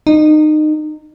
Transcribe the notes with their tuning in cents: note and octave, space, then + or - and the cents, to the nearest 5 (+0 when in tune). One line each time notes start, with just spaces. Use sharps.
D#4 -25